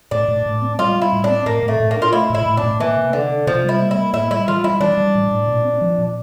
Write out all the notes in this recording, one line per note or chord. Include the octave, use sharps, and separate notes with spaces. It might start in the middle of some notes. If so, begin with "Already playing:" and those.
A2 D4
A2
A2
C4
G3 F4
G3
E4
A2
D4
C4
A2 A#3
A2
A3
A2
A#3
D4
F4
A3 E4
A2 E4
A2
D4
A2
E3 A#3
C3
D3 D4
D4
C3 F3
G3 E4
A#3
E4
A#3
A2 E4
G3 E4
E3 F4
G3 E4
E3 D4
G3
A2
A2
A#2
C4
F3
A#2